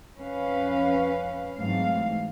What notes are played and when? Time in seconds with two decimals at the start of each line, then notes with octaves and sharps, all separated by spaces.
0.18 F2 C#4 B4 F5
1.58 G#2 E3 F#3 A3 C4 F5